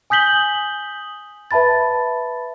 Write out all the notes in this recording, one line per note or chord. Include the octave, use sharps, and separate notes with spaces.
G#5 D#6 G6 B6 F#7 G7
B4 E5 A5 B5 A6